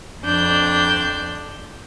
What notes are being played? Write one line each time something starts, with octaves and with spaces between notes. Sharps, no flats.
F2 D4 G6